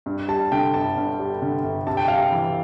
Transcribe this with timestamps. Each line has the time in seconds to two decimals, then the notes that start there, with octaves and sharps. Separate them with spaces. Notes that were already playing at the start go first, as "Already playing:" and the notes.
0.06 G2
0.28 G3 A5
0.52 D3 G5
0.74 G1 A5
0.97 G2
1.19 G3
1.42 D3
1.64 G1
1.87 C3 A5
1.97 G5
2.08 G3 F5
2.17 G5
2.32 E3